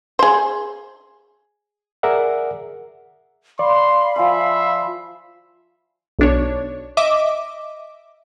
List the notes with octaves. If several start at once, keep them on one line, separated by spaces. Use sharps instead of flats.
G#4 C5
G#4 A#4 D5 E5 F#5
D5 F5 B5 C6
F3 E5 G#5 C6
B1 D4 C#5
D#5 E5 D6